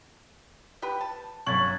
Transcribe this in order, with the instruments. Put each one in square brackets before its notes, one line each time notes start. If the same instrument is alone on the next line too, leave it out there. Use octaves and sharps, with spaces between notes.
[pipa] G4 B4
A5
[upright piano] G1 F#2 F#7 [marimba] C#6 [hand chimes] F#6 G#6 A6